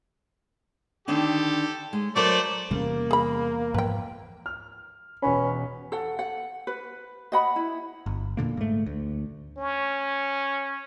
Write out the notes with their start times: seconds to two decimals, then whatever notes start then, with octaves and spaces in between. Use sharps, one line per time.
1.08 D3 D#3 D4 G4 A4
1.93 G#3
2.16 F#3 A3 A#4 C5 D5
2.71 E2 C3 G3 A#3 C#4
3.11 G#4 B5
3.74 G#2 F3 B4 G5
4.46 F6
5.22 E1 C#4 B4 B5
5.92 A4 F#5
6.19 F#5
6.67 B4
7.32 D#5 F#5 B5
7.56 E4
8.06 G1
8.37 E2 A#2 D3 A#3
8.57 G#2 A3
8.86 D2
9.57 C#4